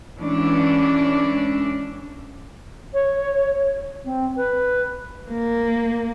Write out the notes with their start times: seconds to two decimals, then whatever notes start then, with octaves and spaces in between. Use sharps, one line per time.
0.19 E3 G#3 C#4 D4
2.93 C#5
4.04 C4
4.36 B4
5.31 A#3